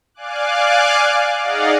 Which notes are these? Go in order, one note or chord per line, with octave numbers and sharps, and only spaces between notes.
D5 F5 G#5 D6 F#6
D#4 G#4 D5 D#5 F5 F#5